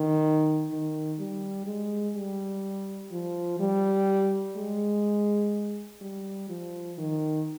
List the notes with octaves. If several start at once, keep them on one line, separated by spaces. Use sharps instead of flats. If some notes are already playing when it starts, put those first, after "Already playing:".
Already playing: D#3
D#3
G3
G#3
G3
F3
G3
G#3
G3
F3
D#3